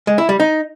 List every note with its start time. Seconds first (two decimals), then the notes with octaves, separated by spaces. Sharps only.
0.07 G#3
0.18 E4
0.29 G3
0.40 D#4